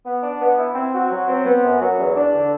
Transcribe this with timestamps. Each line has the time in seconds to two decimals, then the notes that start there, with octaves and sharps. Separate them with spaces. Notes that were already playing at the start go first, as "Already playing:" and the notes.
0.06 B3
0.23 D4
0.41 B3
0.58 E4
0.75 C4
0.94 F#4
1.11 F#3
1.28 C4
1.46 B3
1.63 F#2
1.81 F#3
1.99 E2
2.16 D4
2.34 D3